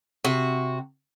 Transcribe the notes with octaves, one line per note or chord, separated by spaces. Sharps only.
C3 F#4